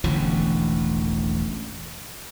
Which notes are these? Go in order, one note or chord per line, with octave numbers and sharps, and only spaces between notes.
E1 A1 D3 F3